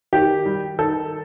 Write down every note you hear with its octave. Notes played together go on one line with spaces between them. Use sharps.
D#3 G4
G3
D#3 A4